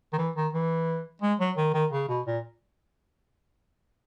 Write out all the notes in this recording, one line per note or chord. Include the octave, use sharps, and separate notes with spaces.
D#3
E3
D#3
E3
G#3
F#3
D#3
D#3
C#3
B2
A#2